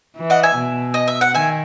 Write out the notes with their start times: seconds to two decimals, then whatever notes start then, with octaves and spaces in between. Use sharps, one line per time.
0.16 E3
0.30 D#5 F#5
0.43 E5 G#5
0.56 B2
0.94 D#5
1.08 E5
1.21 F#5
1.34 D#3 E5 G#5